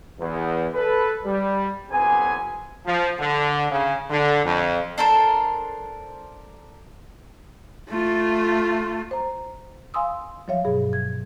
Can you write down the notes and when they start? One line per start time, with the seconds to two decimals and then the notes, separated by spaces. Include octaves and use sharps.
0.19 E2
0.74 A4 B4
1.25 G3
1.91 F#1 C3 B3 G#4 G#5
2.87 F3
3.19 D3
3.71 C#3
4.10 D3
4.45 F2
4.98 D4 A4 A#4 C5
7.89 A3 F4
9.11 C5 A#5
9.94 F5 G#5 C6 D#6 E6
10.48 F3 F#3 C#5 E5 F5
10.65 G2 B2 G#4
10.93 G#6